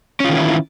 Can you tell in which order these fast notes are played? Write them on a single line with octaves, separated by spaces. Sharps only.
C#4 F4 D#3 E3 E4